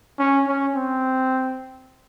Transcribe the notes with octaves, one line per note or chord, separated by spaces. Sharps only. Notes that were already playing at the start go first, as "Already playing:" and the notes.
C#4
C#4
C4